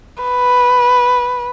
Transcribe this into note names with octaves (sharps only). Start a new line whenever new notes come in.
B4